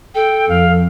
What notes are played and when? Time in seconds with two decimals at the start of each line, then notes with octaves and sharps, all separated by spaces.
0.15 A4 G5
0.49 F2 F5